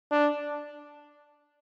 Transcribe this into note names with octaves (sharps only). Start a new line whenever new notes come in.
D4